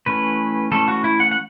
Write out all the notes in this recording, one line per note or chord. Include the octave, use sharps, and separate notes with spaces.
E3 A3 C#4 B4
E3 A3 C#4 A4
F#4
E4
F#5
F#5